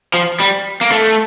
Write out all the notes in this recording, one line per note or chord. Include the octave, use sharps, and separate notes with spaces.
F3
G3
A#3
A3